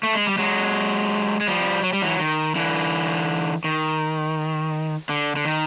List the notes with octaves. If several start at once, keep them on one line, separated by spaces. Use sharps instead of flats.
A3
G#3
G3
F#3 G#3
G#3
F3 G3
F#3
G3
E3 F#3
D#3
D3 E3
D#3
D3
D3
D#3